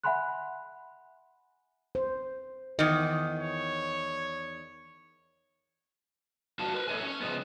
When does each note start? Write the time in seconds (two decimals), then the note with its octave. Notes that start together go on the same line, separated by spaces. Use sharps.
0.04 E5 F#5 G#5 B5 C6 F#6
1.95 C5
2.79 E2 D#3 D#5
3.39 C#5
6.59 G2 D4 F4 F#4 F5 A5
6.74 A#4 B4
6.88 A4 C#5 D5 E5 G#5
7.03 C#4 C#5
7.21 C#3 F3 G#3 B3